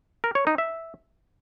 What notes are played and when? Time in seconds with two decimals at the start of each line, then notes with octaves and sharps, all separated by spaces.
0.24 A#4
0.35 C#5
0.47 D#4
0.58 E5